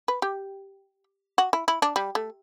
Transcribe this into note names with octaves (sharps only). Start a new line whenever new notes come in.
B4
G4
F#4
E4
E4
D4
G3
A3